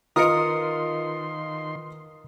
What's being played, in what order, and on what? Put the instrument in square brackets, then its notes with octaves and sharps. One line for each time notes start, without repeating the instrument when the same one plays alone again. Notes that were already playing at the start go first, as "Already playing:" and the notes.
[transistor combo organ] D#3 C6 [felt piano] F4 B4 D#5 [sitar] A#4 [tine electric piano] D#6 C#7